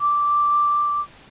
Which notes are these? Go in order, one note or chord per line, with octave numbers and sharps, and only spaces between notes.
D6